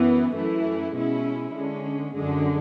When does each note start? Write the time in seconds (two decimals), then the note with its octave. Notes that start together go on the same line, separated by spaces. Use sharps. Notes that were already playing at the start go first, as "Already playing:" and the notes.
Already playing: F#2 E3 B3
0.35 F#2 E3 A3 E4
0.94 B2 G#3 C#4 E4
1.54 D3 G#3 C#4
2.13 F#2 D3 G#3